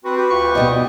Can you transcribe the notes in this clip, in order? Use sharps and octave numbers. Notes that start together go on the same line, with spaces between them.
C4 F#4 B4
G4 B4
D2 F4 C#6
B2 G3 D#5